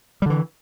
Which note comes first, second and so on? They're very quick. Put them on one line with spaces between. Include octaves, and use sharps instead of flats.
G3 D3 E3